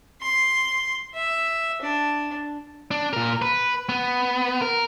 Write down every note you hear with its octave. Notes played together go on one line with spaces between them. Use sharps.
C6
E5
D4
D4
A#2 A#4
B4
B3
A#4